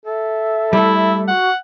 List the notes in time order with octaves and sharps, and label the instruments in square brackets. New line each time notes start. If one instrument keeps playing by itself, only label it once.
[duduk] A4 [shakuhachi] E5
[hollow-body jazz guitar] G3 A3 [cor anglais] E4
[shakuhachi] F#4 [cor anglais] F#5